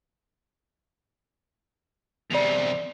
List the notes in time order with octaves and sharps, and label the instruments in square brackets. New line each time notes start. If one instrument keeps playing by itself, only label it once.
[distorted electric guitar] E2 C3 [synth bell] D5 F7